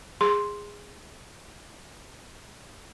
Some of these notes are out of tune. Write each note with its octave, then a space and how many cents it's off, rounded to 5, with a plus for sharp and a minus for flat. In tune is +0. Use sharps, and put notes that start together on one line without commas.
G#4 -15 C6 +0